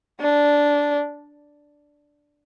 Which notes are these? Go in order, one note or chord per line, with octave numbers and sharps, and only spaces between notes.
D4